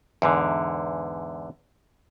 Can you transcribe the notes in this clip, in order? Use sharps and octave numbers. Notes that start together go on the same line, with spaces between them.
E2 G#2 D3